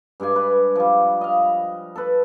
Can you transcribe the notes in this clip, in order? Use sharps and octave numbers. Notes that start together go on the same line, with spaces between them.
G2 G#3 D5 G#5
B4
F3 G3
D#5 F5
A4 B4